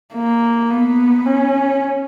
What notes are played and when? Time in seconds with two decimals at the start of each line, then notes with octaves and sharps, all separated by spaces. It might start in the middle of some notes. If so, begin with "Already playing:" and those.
0.14 A#3
0.70 B3
1.26 C#4